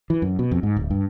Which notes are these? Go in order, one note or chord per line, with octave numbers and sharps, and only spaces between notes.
E3
F#2
B2
F2
G#2
D1
G2